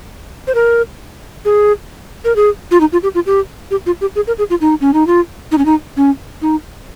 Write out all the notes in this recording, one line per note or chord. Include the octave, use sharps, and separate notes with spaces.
C5
A#4
G#4
A#4
G#4
F4
D#4
F4
G4
F4
G4
G4
F4
G4
G#4
A#4
G#4
F4
D#4
C#4
D#4
F4
D#4
C#4
D#4
C#4
D#4